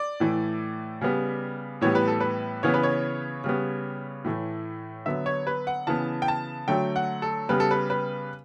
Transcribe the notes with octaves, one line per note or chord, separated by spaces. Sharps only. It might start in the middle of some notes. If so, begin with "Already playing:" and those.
Already playing: D5
A2 E3 A3
C#3 G3 B3
A2 E3 G3 B3 C#5
B4
A4
B4
C#3 E3 B3 C#5
B4
C#5
C#3 G3 B3
A2 E3 A3
D3 F#3 B3 E5
C#5
B4
F#5
C#3 E3 B3 A5
G5
A5
D3 F#3 A3 G5
F#5
A4
C#3 G3 B3 B4
A4
B4
B4